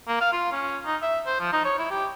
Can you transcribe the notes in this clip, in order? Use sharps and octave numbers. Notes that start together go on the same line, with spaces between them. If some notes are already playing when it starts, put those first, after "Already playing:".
A#3
F5
F4
C#4
D#4
E5
C5
F3
D#4
C#5
E4
G4